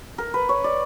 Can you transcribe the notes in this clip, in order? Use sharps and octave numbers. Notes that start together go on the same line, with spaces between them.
A#4
B4
C#5
D5